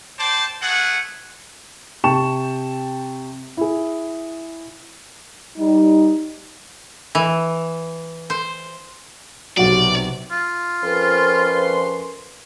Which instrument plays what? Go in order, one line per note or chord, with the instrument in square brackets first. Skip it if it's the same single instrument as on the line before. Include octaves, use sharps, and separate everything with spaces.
[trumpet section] C5 D5 G5 A5
A3 G#4 F#5
[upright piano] C3 G5 A5 C#6 E7
E4 G#4
[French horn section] G3 D#4
[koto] E3
C5
[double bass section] B1 C3 [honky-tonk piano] F#3 F#4 [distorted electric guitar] D5
[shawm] F4
[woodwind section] F2 F3 C6 [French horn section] C#4 A#4 B4